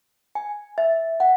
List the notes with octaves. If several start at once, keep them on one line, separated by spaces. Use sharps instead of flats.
G#5
E5
F#5